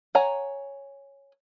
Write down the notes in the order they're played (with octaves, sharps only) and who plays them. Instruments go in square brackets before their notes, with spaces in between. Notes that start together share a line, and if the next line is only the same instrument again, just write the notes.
[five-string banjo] C#5 F#5 G#5 A#5